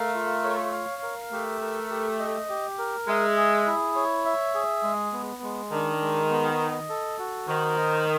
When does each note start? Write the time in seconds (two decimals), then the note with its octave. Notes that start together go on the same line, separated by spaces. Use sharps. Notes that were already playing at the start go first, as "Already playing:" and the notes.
Already playing: A3 A#4 F5
0.15 F4
0.44 C#5
0.73 F5
1.03 A#4
1.32 A3 G4
1.61 A#4
1.91 G4
2.20 D#5
2.49 G4
2.78 A#4
3.08 G#3 E5
3.37 G#4
3.67 E4
3.96 C#5
4.25 E5
4.54 G#4
4.83 G#3
5.13 B3
5.43 G#3
5.71 D#3 D4
6.02 G#3
6.30 B3
6.60 D#5
6.89 A4
7.19 F#4
7.48 D#3 C5
7.77 D#5